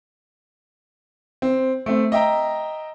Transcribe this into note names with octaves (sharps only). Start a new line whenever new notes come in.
C4
A3 C4
D#5 E5 G5 A#5